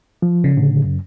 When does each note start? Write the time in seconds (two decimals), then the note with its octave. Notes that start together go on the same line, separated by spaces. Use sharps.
0.22 F3
0.44 C#3
0.57 A2 D3
0.84 F#2